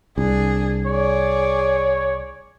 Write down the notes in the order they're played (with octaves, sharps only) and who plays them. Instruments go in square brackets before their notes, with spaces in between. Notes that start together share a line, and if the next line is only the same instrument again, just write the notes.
[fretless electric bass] C2 [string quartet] D4 G#4
[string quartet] G#4 D5 [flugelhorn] C#5